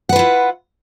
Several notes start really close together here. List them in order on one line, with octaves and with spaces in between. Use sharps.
F#5 B4 F4 E4